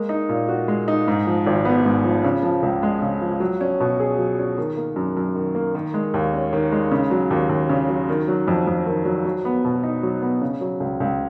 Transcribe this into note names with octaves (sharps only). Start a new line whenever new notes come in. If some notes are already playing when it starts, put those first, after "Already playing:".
Already playing: G#3 A#3
D#4
A#2
F#4
G#3
D#4
G#2
F3
G#1
B3
G#2
F3
C#3
F3
C#2
G#3
C#3
F3
F#3
C#4
B2
G#4
F#3
C#4
D#3
A#3
F#2
F#2
D#3
A#3
D#3
G#3
D#2
C#4
D#3
G#3
C#3
F#3
D#2
D#2
C#3
F#3
D#3
F#3
F2
F2
D#3
F#3
F#3
B3
B2
D#4
F#3
B3
C#3
F#3
C#2
C#2